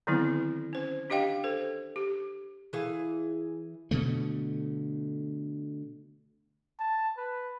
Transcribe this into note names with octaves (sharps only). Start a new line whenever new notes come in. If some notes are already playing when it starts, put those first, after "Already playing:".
D3 D#3 F#3 B3 C4 E4
C#4 C5
D4 G4 D#5 F5 G5
A4 C5
G4
E3 G#4 F5
B2 D3 A3
A5
B4